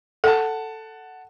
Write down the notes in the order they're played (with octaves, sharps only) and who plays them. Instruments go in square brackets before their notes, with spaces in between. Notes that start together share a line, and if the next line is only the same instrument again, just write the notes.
[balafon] A4 [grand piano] F#5 A5